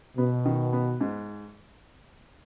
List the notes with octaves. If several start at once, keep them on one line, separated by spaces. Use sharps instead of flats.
B2 B3
D#3
B3
G#2